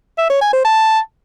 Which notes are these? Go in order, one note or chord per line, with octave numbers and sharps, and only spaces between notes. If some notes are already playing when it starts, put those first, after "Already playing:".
E5
C#5
G#5
C5
A5